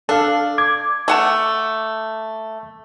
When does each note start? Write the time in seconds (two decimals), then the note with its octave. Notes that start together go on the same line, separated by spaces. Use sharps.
0.09 D4 A4 F5
0.58 D6 G#6
1.08 A3 F#5 A5